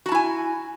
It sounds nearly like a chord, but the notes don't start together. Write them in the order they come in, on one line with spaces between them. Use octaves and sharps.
F#4 A5 E4 G#5